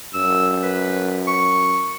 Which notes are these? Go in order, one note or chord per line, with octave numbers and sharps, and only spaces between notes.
F#2 E6
B4
C#6